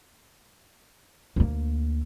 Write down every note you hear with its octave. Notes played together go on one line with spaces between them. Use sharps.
D2 A#3